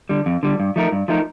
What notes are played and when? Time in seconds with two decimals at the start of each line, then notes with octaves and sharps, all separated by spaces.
0.09 D3 G3
0.26 F2
0.43 D3 G3
0.60 G2
0.76 F3 A3 D#4 A#4
0.92 G2
1.08 F3 A3 D#4 A#4